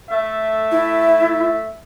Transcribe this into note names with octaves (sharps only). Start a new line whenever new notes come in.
A3 E5
E4